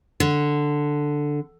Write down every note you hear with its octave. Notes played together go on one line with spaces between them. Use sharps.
D3